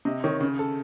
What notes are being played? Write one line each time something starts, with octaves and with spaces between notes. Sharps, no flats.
C3 D#5
D#3 C#5
C#3
A4